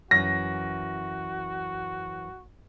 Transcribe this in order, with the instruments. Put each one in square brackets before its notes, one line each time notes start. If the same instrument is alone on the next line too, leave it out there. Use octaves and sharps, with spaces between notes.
[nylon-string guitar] F#2 E3 [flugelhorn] F#4 [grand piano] A#6